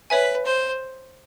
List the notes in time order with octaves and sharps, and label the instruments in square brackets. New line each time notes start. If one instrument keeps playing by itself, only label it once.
[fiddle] B4 [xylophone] C#5 E5 G#5
[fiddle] C5